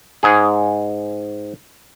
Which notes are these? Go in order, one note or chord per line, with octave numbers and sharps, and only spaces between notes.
G#2 G#4